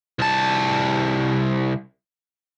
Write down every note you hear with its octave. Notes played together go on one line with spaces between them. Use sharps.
C2 A5